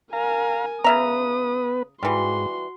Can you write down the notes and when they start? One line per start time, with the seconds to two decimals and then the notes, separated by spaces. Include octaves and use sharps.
0.13 A#4 F5 G#5 A#5
0.84 C#3 B3 B4 E5 A#5 D#6
2.03 G#2 E3 G3 F#4 C6